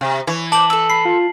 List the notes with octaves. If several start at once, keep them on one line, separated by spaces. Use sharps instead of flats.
C3
E3 C#5
C5 A5 D6 F#7
A4 E6
B5 C7
F4